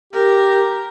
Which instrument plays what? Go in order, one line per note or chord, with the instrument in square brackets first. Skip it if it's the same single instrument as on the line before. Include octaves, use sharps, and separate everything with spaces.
[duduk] G4 [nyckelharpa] A#4